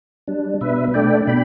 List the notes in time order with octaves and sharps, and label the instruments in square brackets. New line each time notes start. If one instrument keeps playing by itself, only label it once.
[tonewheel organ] G3 D4
B2 B4 E5
A3 D4 D5 G5
B2 G5 B5